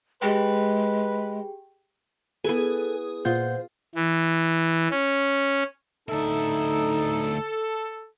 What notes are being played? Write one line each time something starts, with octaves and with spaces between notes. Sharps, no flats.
G#3 G4 G#4 B4 G5
B3 E4 G#4 A4 B4
A#2 F4 C5 F#5 G6
E3
C#4
D2 D#4 E4 A4